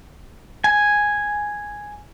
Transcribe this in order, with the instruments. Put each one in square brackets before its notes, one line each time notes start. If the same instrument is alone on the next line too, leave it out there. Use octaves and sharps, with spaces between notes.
[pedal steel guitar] G#5